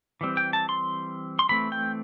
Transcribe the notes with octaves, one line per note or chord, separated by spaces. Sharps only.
E3 G3 C4
G5
A5
C6
C6
E3 A3 C4 B5
G5